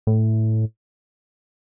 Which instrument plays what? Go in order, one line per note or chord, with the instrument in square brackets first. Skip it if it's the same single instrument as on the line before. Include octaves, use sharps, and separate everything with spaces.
[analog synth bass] A2